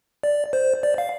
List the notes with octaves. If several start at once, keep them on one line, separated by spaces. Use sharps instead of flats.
D5
C5
D5
F5